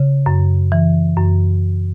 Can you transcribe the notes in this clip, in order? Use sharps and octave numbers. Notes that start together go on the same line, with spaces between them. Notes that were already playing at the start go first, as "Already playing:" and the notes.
Already playing: C#3
F#2
E3
F#2